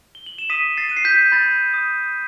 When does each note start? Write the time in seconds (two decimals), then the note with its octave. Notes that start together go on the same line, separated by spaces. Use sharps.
0.15 G7
0.26 F#7
0.38 E7
0.50 D#6 B6 D#7
0.77 A6 C7
0.89 F#6 D#7
0.97 C7
1.05 G6 B6
1.32 B5 A6
1.74 D#6